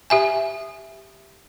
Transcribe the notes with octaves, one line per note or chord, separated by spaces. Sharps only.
G4 E5 G#5